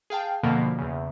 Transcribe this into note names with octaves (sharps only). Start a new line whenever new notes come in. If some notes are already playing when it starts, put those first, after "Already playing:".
G#4 F5 G5 A5
F2 B2 D3 F3 A#3
E2 C#3